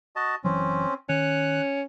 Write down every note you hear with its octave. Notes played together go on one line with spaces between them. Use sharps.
F#4 D#5 A5
F#1 E3 F#3 C4 C#4
D#3 C#4 F#6